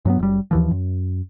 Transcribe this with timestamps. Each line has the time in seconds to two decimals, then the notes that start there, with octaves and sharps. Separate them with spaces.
0.05 G2 F#3 A#3 B3
0.19 F#1 G3
0.51 D#2 E3 F3
0.71 F#2